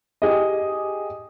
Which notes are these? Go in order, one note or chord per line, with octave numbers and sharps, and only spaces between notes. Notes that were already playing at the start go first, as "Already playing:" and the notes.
G4 G#4 D#5